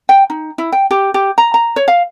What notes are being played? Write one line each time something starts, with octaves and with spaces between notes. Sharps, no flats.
G5
D#4
E4
G5
G4
G4
A#5
A#5
C#5
F5